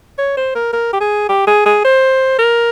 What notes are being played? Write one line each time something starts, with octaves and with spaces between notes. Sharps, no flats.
C#5
C5
A#4
A#4
G4
G#4
G4
G#4
G#4
C5
A#4